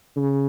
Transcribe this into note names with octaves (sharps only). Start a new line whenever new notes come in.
C#3